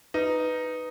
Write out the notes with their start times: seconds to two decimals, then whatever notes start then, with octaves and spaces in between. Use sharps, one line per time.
0.14 D#4 B4